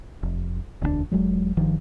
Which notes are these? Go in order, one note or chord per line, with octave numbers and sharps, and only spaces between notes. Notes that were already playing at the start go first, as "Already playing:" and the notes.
F1
E1 D2 G3 D4
E1 F#3 G#3
G1 D#3 F3